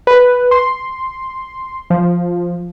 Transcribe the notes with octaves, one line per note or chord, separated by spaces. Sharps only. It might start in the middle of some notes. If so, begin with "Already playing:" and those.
B4
C6
F3